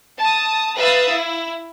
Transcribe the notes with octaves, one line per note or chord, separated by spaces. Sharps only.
A5 D#6
B4 E5 F5 D#6 A6
E4